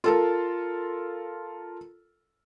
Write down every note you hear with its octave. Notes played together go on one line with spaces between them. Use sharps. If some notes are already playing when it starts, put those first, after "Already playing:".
F4 A4 A#4